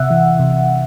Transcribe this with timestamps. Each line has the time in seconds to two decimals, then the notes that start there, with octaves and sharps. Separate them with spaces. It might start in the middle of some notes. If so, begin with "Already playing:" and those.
Already playing: C3 E5 F#5
0.10 E3
0.39 C3